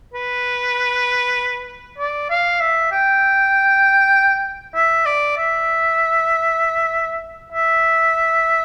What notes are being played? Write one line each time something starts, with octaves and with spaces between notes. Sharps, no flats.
B4
D5
F5
E5
G5
E5
D5
E5
E5